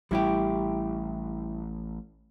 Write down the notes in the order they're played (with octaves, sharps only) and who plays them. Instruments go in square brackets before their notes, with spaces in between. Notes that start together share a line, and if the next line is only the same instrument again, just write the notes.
[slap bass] A1 [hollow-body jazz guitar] G3 E4 G4